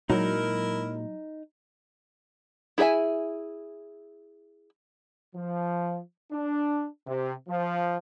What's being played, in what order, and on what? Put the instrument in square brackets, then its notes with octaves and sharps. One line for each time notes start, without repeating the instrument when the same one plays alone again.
[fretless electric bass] A#2 G#3 [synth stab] F#3 [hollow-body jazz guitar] D#4 [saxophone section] E4 A#4
[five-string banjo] E4 G#4 A#4 E5 G#5
[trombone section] F3
D4
C3
F3